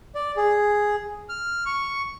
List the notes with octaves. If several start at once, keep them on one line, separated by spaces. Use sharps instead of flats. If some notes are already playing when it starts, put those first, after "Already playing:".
D5
G#4
F6
C#6